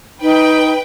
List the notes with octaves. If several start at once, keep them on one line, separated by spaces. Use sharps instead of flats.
D#4 B4 G5